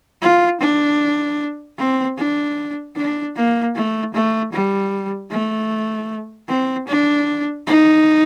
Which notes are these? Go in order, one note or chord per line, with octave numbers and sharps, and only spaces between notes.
F4
D4
C4
D4
D4
A#3
A3
A3
G3
A3
C4
D4
D#4